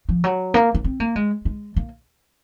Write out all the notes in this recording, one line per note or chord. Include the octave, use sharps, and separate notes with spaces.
F3
F#3
A#3
A#3
C4
A#3
G#3
G#3
A#3